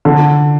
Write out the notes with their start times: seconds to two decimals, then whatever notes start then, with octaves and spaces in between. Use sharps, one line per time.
0.05 D3